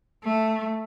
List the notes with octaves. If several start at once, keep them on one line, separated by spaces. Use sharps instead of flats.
A3